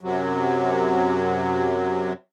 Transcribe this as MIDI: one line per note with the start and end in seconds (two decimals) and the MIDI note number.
0.01 2.13 42
0.01 2.13 48
0.01 2.13 54